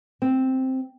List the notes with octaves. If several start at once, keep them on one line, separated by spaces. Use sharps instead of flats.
C4